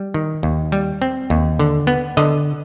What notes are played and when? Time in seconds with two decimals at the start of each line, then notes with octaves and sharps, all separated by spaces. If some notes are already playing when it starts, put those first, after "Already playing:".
Already playing: G3
0.14 D#3
0.43 D#2
0.72 G3
1.02 C4
1.30 D#2
1.59 D3
1.87 B3
2.17 D3 D#5